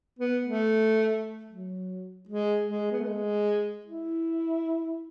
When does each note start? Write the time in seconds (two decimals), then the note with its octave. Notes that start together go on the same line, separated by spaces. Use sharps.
0.19 B3
0.46 A3
1.50 F#3
2.29 G#3
2.68 G#3
2.92 B3
3.00 A3
3.07 G#3
3.86 E4